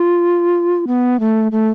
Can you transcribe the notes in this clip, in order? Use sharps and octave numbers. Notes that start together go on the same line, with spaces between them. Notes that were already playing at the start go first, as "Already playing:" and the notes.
Already playing: F4
B3
A3
A3